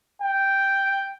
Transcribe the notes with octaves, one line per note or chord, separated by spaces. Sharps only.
G5